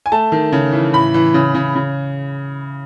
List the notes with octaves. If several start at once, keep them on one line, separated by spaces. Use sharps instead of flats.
G#5
A3 A5
D#3
C#3
E3
A2 B5
E3
C#3
C#3
C#3